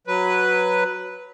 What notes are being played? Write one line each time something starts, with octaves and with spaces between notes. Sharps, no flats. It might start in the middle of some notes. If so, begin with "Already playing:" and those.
F#3 B4